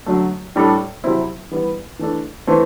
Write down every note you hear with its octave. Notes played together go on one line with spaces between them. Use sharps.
F#2 D3 F#3 A3
A2 G3 D4 A4
C3 F#3 C4 E4
E3 G3 B3
E3 A3 D4 A4
E3 A3 C4